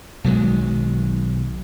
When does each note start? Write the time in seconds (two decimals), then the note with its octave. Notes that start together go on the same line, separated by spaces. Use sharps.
0.24 B1 D#3 F#3 G#3